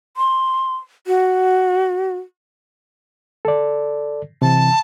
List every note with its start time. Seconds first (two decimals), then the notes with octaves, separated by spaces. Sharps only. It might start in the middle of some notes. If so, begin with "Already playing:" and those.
0.17 C6
1.07 F#4
3.45 A4 D5
4.42 C3 E3 A5